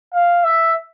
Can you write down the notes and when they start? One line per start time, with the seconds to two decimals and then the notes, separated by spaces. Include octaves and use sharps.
0.13 F5
0.44 E5